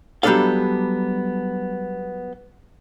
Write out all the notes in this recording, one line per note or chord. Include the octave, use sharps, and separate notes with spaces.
F#3 G3 B3 D4 A4 F5